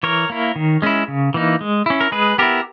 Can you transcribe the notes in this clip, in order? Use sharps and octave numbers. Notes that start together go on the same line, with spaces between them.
E3 A#4 C#5
A#3 E4
D#3
G#3 C#4 E4
C#3
E3 A#3 D#4
G#3
C#4 E4
A#4
G#3 G#4 B4
B3 E4 G4 A#4